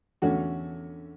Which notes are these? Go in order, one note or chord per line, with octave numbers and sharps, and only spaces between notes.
E2 D3 A3 C#4 F#4